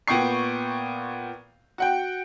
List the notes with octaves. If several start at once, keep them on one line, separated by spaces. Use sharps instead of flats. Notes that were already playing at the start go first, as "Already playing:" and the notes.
A#2 B3 G5 C#6 C7
F#4 F#5 G5